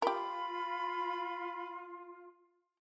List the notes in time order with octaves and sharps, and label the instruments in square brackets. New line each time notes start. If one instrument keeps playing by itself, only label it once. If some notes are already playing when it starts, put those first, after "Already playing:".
[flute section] F4 [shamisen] G4 A#4 [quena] B5